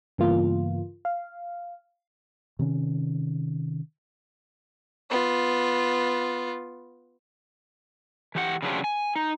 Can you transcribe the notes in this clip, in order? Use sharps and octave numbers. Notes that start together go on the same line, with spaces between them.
G2 C#3 E3 A#3 B3 F4
F5
C3 D#3 C#4
B3 F4
E3 G4 F#5
C#3 F3 F#3 D4 F4 G4
G#5
D#4